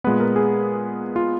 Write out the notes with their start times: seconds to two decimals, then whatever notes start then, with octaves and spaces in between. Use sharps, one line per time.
0.04 A#2 G#3 B3 B4
0.20 A#4
0.36 G#4
1.16 F4